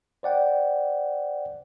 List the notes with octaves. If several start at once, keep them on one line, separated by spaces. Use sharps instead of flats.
C5 D5 F#5 G5